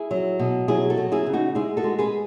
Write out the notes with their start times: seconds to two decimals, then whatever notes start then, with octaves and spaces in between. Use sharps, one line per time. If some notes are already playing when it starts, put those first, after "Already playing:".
Already playing: E4 G#4
0.11 F#3
0.39 B2
0.68 F#3 E4 G#4
0.90 F#4 A4
0.97 F#3
1.12 E4 G#4
1.26 C#3
1.33 D#4 F#4
1.55 G#3 E4 G#4
1.77 F#4 A4
1.84 G#3
1.99 G#4 B4